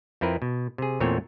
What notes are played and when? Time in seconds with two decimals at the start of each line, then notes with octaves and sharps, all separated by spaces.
0.21 F2 C4 E4 A#4 B4
0.42 B2
0.78 C3 G#4
1.00 E2 A#2 A3 C4 C#5